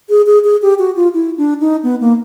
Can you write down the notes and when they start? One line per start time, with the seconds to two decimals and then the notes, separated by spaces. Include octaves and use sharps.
0.10 G#4
0.26 G#4
0.44 G#4
0.62 G4
0.79 F#4
0.96 F4
1.14 E4
1.37 D4
1.60 D#4
1.83 B3
2.00 A#3